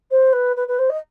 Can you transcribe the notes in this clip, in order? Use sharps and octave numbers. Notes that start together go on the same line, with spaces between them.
C5
B4
B4
B4
C5
D#5